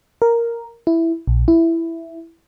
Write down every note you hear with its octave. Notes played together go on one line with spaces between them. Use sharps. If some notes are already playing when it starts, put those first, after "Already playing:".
A#4
E4
A#1
E4